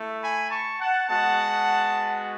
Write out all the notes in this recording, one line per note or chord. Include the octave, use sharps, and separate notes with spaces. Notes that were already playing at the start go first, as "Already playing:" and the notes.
Already playing: A3 E4
G#5 B5
A5 C#6
F#5 A5
G#3 B3 F#4 F#5 A5